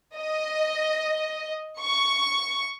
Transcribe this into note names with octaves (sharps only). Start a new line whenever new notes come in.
D#5
C#6